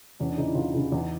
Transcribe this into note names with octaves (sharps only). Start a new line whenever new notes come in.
E2 C#4
D4
C#3 E3 D#4
E4
E2 F4
C#3 E3 E4
E2 D#4